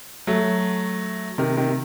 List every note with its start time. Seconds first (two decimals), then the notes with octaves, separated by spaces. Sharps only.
0.27 F#3 A3
1.38 C3 D#3
1.57 C3 D#3